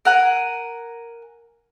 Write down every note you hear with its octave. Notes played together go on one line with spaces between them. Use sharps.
A#4 F#5 G#5